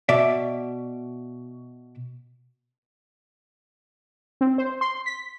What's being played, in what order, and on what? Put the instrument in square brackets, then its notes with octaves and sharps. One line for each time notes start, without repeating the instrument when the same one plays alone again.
[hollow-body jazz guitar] B2 D5 E5
[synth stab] C4
C5
C6
B6